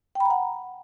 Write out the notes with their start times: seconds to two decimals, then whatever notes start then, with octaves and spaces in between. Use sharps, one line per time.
0.15 G5
0.20 B5
0.25 A#5
0.30 F#5